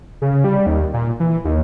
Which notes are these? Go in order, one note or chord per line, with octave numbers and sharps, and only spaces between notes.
C#3
G3
D#2
A#2
E3
D#2